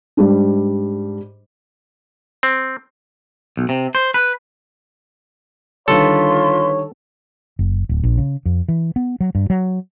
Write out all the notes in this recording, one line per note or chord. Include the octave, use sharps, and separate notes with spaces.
G#2 G3 D4
C4
B1
C3
C5
B4
D3 D#3 G3 F4 A4 B4 C#5 C6
F#1
D1
A#1
C#3
F2
E3
B3
F#3
G2
F#3